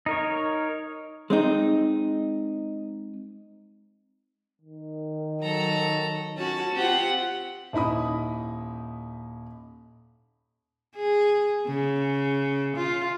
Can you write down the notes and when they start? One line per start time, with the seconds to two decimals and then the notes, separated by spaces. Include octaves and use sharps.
0.06 D#4 A#4 C#5
1.30 G#3 C4 D#4
4.62 D#3
5.42 F#3 A4 A#5
6.37 C#4 F#4 A5
6.75 C4 F4 G4 F#5
7.73 D#1 D#4 E4 B5 D#6
10.96 G#4
11.67 C#3
12.76 F4